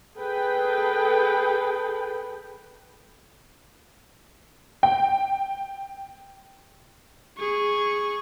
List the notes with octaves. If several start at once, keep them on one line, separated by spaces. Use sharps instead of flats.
G#4 A4 B4 G5
G5
G#4 C#6